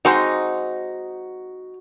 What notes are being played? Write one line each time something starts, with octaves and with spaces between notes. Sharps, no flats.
G#3 C4 D#4 F#4